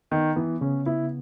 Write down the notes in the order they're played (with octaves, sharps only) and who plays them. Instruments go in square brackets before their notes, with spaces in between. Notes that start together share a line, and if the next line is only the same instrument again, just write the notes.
[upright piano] D#3 [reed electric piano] B3
[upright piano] E3 [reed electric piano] B3
[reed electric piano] C#3 [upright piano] C#4
[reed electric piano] B3 [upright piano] E4